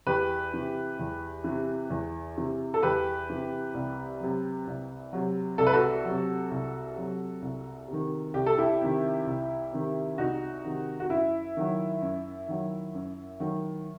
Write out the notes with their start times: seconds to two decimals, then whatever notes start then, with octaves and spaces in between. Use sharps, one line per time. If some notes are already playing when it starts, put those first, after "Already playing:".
0.07 E2 G4 B4
0.54 C3 E3
0.99 E2
1.44 C3 E3
1.90 E2
2.37 C3 E3
2.74 A4
2.82 E2 G4 B4
3.29 C3 E3
3.74 C2
4.20 C3 F#3
4.67 C2
5.13 C3 F#3
5.58 C2 A4
5.67 B4
5.73 F#4 A4
6.05 C3 F#3
6.51 C2
6.96 C3 F#3
7.42 C2
7.88 C3 D#3
8.34 C2 G4
8.46 A4
8.58 E4 G4
8.81 C3 D#3
9.27 C2
9.72 C3 D#3
10.18 C2 D#4 F#4
10.64 C3 D#3
11.00 F#4
11.10 F#2 E4
11.57 D#3 F#3
12.02 F#2
12.48 D#3 F#3
12.94 F#2
13.40 D#3 F#3